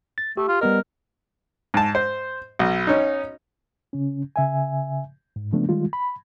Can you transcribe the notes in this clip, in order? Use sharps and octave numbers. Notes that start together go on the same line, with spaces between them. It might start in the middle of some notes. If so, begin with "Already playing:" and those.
A6
A3 G4
F4
G3 B3 A#4 D#5
G#2 A5
C5
B1
C#4 D#4
C#3 C#4
C#3 E5 G#5
G#2
C#3 F3 A3 B3 D4
D#3 G3 G#3 F4
B5